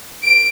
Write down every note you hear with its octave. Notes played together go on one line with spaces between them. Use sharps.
D7